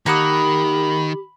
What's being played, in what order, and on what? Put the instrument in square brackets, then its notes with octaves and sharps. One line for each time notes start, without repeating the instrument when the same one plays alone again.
[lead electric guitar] D#3 [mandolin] A#3 F#5 D#6 [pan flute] G4 [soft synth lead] B5